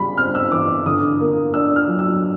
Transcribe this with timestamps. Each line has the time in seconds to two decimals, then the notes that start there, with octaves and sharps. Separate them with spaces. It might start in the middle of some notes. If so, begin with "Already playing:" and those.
Already playing: C#3 G3 B5
0.17 C4 F6
0.35 E6
0.51 E3 D6
0.86 D3 D#6
1.20 A#3
1.54 D4 E6
1.76 F6
1.88 F#3
1.99 E6